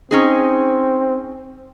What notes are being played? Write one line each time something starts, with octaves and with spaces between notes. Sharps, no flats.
C4 C#4 D#4 G#4